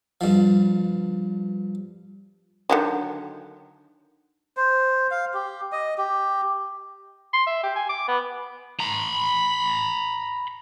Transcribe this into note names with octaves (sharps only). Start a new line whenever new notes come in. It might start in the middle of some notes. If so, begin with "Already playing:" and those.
G2 F3
D3 D#3 F#3
C5
F5
G4
D#5
G4
C6
E5
G4
G#5
D6
B3
A#5 B5